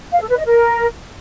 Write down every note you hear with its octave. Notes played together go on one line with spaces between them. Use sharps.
F5
A4
B4
D#5
A#4